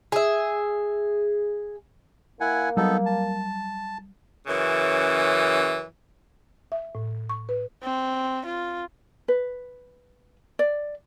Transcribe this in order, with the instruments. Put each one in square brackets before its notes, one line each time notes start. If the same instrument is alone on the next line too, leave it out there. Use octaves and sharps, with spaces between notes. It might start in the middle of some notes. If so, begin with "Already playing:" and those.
[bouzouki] G#4 E5
[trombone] A#3 [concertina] E4 F#5 G#5
[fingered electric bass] F#3 G3 [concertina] B3 D#4 A4
[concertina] A5
[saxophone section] F#2 C#3 E3
[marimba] E5
A2
C#6
B4
[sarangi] C4
F4
[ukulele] B4
D5